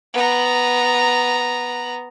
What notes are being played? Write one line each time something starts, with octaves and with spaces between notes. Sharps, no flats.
B3 A#5